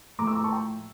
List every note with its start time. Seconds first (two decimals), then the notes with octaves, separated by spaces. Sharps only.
0.19 A2 F3 A3 A#5 D6
0.27 C#6 E6
0.35 A#5 D6
0.44 A5 C#6
0.52 G5 A#5